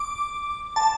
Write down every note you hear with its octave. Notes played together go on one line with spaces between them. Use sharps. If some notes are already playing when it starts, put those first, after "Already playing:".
Already playing: D6
A5